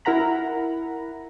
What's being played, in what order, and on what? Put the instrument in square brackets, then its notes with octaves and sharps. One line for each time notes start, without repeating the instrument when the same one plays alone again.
[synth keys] E4 A#4 F#5 A#5 B5